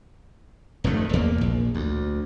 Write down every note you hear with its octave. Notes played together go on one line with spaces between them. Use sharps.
F1 G2 D#3 A3
E2 A#3
A#1
D2